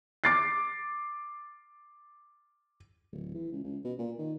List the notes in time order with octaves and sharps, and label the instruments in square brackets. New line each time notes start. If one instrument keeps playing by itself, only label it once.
[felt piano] D6 A6 C7
[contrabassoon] D1
E3
C#2
C#2
B2
A#2
D#3